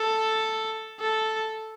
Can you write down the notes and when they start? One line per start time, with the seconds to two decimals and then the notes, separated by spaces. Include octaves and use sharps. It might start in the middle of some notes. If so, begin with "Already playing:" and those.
Already playing: A4
1.00 A4